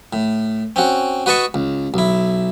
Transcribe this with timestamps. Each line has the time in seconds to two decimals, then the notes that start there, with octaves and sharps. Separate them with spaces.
0.13 A2
0.76 C4 C#4 F#4
1.26 F#4 B4 D#5 A5 C#6
1.54 C#2
1.94 B1 E4